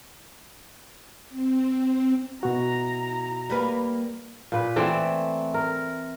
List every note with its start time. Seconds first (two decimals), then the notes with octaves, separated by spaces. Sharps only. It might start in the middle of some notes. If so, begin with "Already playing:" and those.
1.29 C4
2.43 B2 E4 F#4 A#5
3.50 G3 A#3 B4
4.52 A#2 B4
4.76 E3 A3 C4 D5
5.54 A#4